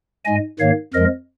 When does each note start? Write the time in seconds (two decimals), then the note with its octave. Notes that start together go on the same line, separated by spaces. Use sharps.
0.24 G#2 G#3 D#5 G#5
0.59 G#2 D#3 A#3 C#5 F5
0.94 F2 F3 G#3 A#4 D#5